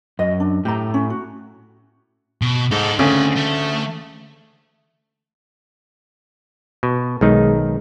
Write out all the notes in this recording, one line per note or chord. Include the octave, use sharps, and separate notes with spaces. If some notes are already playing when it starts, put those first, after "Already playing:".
F#2 D#5
D4
A2 G4 A#5
C#4
F#4
B2
G#2 D#4 A4
D2 C#3 C4 G#5
A3
B2
B1 D#3 G#3 D#4